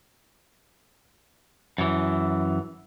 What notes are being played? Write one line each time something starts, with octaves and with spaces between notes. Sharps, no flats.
F#2 E3